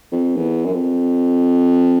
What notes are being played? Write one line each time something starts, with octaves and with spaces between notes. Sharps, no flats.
F2
E2
F#2
F2